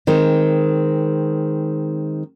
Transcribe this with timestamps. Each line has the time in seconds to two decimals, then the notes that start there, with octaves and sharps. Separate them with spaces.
0.07 D#3 G#3 C4